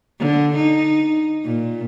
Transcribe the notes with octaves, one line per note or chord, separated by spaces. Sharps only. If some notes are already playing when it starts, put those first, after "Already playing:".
D3
D#4
A#2